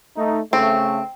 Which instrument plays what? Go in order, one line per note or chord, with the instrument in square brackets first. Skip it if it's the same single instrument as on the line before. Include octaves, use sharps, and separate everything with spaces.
[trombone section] A3 D#4
[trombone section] C#3 A3 [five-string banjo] C4